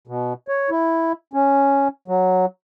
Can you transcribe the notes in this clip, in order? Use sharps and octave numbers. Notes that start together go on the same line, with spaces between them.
B2
C#5
E4
C#4
F#3